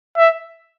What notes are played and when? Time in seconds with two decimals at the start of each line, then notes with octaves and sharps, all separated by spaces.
0.17 E5